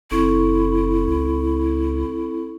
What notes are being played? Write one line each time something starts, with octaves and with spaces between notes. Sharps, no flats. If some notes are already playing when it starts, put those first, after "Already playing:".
F#1 C4 E4 A4 C#6
C#2